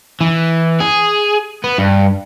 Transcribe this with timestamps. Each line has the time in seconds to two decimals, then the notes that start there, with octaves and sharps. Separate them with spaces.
0.21 E3
0.81 G#4
1.64 B3
1.78 G2